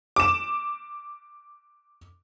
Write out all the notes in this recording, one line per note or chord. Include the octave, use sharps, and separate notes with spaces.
D6 E7